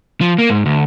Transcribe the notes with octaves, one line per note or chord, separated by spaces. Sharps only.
F3
A#3
G#2
D2